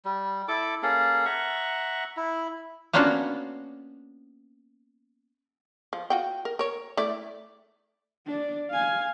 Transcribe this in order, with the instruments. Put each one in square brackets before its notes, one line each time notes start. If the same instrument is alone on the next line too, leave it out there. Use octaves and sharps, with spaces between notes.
[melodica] G3
E4 A4 D6
A#3 C#4 G#4 A4
E5 F#5 A#5 C#6
E4
[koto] A#3 B3 C#4 D4 F4 F#4
[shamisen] F3
F4 F#4 G5
A#4
A#4 C#5
A3 E4 D5
[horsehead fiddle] D4 D5
F5 G#5